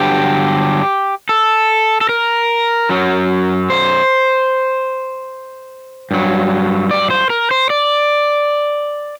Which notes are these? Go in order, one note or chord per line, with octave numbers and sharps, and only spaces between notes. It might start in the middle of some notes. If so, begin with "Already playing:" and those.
Already playing: G2 D3 F#3 G4
A4
A4
A#4
F#2 F#3
C5
G2 F#3
D5
C5
A#4
C5
D5